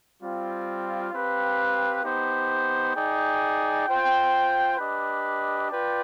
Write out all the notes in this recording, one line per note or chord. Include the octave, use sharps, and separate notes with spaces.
G3 C4 F4
C4 G4 B4 F5
B3 D#4 G4 C5
D#4 G#4 D5 G5
F4 C5 G5
D4 G4 B4 D#5
F4 B4 D5 G5